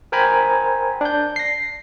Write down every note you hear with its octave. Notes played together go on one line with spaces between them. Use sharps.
A#4 C5 G5 G#5 A#5 B5
D4 G6
A#6 C7